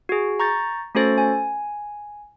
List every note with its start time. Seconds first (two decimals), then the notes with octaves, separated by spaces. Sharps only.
0.09 F#4 G#4
0.40 A#5 C#6 G6 A6
0.95 A3 C#4 F#4 A4 C5 A6
1.18 G#5